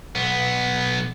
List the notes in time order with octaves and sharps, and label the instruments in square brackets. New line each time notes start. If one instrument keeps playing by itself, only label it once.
[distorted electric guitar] B1 B3